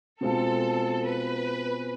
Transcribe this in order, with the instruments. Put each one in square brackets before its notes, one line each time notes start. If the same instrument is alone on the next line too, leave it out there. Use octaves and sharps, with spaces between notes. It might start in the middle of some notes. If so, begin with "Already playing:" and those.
[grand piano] B2 G#3 C4 F4 [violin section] A4
[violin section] B4